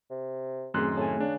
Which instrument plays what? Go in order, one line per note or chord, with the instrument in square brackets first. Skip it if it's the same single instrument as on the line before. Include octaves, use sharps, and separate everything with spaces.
[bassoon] C3
[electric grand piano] F#2 C6 F#6 [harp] A2 D#3 [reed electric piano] A3 C4 G#4
[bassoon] A2 [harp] G#5 A5
[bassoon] C#3 [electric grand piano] D4